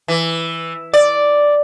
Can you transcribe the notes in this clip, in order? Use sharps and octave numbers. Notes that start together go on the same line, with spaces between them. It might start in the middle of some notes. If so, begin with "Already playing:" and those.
E3
D5